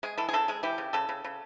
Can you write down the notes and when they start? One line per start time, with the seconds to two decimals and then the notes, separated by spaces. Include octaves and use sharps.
0.03 G#3 G#4
0.18 E3 A4
0.29 G#4
0.33 C#3 A4
0.48 G#3 G#4
0.63 E3 G4
0.78 C#3
0.93 C#3 A4
1.09 C#3
1.24 C#3